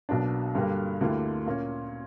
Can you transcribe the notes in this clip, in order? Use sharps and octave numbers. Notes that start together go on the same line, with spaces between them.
B1 B2 F#3 A#3 D4
G2 D3 G3 A#3
D2 D3 A#3 E4 G4
A#2 A#3 C#4